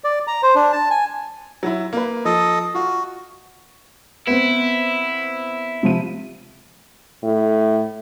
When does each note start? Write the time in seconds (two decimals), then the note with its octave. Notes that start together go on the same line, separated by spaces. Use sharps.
0.04 D5
0.27 A#5
0.43 C5
0.55 D4
0.72 A5
0.91 G#5
1.63 F#3 E4
1.93 A#3 B4
2.25 F3 A4 D#5
2.75 F4 F#4
4.27 B3 C4 E4
5.83 C3 F3 D#7
7.23 A2